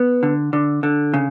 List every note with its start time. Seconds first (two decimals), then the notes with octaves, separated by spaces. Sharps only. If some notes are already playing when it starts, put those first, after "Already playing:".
Already playing: B3
0.23 D3
0.53 D3
0.83 D3
1.14 C#3